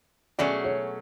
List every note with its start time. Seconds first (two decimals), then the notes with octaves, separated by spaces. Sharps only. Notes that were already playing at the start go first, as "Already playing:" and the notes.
0.39 B2 F#3 A3 C#4 G#4 D5
0.64 C#5